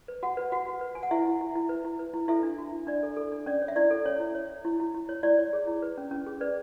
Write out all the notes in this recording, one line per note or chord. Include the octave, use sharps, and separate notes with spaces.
B4
F#4 F#5
B4
F#4 F#5
F#4
B4
F#4 G#5
F#5
E4 E5
E4
E4
E4
B4
E4
B4
E4
E4 A4 E5
D4
F#4
D4
D4 D5
A4
A4
D4
C#4 D5
C#5
E5
E4 D5
A4
C#4 C#5
E4
C#5
C#5
E4
E4
E4
C#5
E4 D5
C#5
G#4
E4
B4
C#4
C#4
G#4
B4 D5